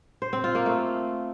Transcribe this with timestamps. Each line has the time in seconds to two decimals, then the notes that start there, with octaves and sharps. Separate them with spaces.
0.22 C5
0.33 C4
0.44 F4
0.55 A#3
0.66 A3